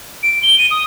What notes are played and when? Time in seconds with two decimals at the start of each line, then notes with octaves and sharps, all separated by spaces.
0.23 D7
0.43 G7
0.58 D#7
0.71 D#6